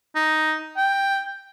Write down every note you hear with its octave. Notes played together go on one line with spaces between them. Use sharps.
D#4
G5